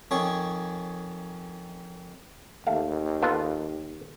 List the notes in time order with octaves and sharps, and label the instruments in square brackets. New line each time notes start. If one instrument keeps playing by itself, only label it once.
[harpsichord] F2 D#3 G#4 C#5 D6
[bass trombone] D#2 [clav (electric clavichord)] A3 F5
[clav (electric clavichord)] B3 F4 A4